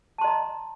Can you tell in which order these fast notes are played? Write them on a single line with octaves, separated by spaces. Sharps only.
A5 C6 D#5 A#5